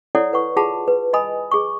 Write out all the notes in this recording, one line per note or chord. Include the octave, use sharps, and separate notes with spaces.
E4 A4 C#5 D5 F#5
B4 F#5 C#6
F4 G#4 F#5 A5 B5
B4
D#5 G#5 B5 D#6
G#4 C#6